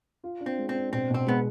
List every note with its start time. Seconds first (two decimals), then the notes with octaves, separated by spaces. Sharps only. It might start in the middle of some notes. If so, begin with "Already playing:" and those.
0.24 F4
0.41 D4
0.46 C4
0.58 G#3
0.69 C4
0.75 D4
0.93 B2 C4
1.10 B2 C4
1.27 G#3 B3